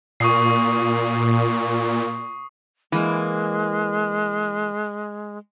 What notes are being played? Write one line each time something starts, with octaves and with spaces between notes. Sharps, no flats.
A#2 C#6 D#6 C7
E3 G#3 A#3